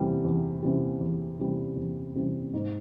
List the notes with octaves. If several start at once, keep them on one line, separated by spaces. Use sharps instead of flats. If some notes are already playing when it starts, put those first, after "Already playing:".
Already playing: E2 C3 E3 G3
E2
C3 E3 G3
E2
C3 E3 G3
E2
C3 E3 G3
G#2